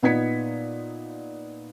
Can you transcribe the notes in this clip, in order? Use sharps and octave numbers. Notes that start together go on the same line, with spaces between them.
A#2 B3 D#4 G#6 B6 C#7